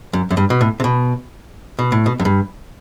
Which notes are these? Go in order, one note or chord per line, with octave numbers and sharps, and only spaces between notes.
F#2
F#2
G2
B2
A2
C3
B2
B2
A2
B2
F#2
G2